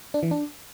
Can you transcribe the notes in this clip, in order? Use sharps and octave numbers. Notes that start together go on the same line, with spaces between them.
D4
E3
D4